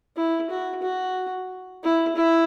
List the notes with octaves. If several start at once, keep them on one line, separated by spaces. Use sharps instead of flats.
E4
F#4
F#4
E4
E4